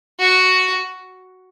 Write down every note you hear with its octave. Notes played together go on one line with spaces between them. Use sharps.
F#4